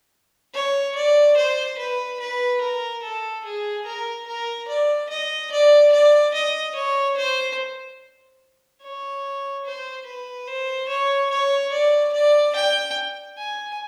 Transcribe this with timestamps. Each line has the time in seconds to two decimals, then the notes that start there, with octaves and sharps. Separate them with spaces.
0.54 C#5
0.96 D5
1.37 C5
1.78 B4
2.20 B4
2.61 A#4
3.03 A4
3.44 G#4
3.86 A#4
4.27 A#4
4.68 D5
5.09 D#5
5.51 D5
5.93 D5
6.34 D#5
6.75 C#5
7.17 C5
8.82 C#5
9.65 C5
10.07 B4
10.47 C5
10.89 C#5
11.31 C#5
11.72 D5
12.13 D5
12.55 G5
13.37 G#5